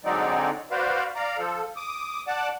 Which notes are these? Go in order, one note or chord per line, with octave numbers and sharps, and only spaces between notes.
D3 F#3 G#3 C4 D#4 D5
F#4 B4 C5 D5 F5
D5 F5 A#5
F3 A4
D6 D#6
D5 F#5 A5 D6